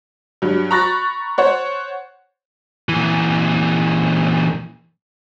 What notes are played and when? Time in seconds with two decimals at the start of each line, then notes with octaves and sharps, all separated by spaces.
0.42 G2 F#3
0.71 A#5 B5 C#6 F#6 A6 A#6
1.38 C5 C#5 F#5
2.89 A#2 E3